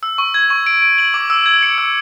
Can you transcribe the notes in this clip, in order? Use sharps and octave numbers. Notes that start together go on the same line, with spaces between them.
E6
C#6
G#6
C#6
D7
D7
F#7
D6
E6
G#6
C#7
E6